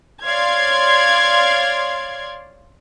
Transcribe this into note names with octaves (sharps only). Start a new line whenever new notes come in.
C#5 D5 F5 C6 G#6